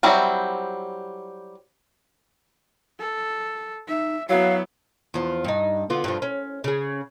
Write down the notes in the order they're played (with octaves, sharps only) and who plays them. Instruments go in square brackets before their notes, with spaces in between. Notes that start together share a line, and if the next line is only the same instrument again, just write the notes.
[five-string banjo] F#3 G3 C4 E4
[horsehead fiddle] A4
[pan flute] D#4 [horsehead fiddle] E5
[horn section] F#3 [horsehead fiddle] B3 E4 [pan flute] F5
[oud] E2 F3
G2 D#4
D3 B3 F4
G2 F3
C#4
C#3 G#4